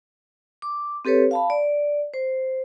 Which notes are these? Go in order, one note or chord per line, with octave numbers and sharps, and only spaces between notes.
D6
C4 G4 A4 B4 C#5
F5 A5 B5
D5
C5